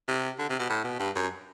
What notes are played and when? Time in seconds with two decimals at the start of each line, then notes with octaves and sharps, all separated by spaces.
0.08 C3
0.39 D3
0.49 C3
0.59 B2
0.69 A2
0.84 B2
0.99 G2
1.15 F#2